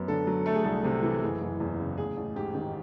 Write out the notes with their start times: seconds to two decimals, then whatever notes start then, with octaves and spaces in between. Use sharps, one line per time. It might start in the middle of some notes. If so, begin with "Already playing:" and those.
Already playing: F#2 B3
0.08 D3 A4
0.27 F#3
0.46 A3 A4
0.55 G#4
0.64 C2 A4
0.84 C3
1.03 E3
1.22 F#1 G#4
1.41 F#1
1.60 E2
1.79 C#3
1.98 A1 G#4
2.17 A1
2.36 G#2 G4
2.55 D#3